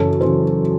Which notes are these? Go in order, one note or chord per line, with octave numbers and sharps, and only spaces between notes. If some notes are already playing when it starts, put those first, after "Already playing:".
Already playing: F#2 C#3 E3 A4 C#5
C#3 E3 C5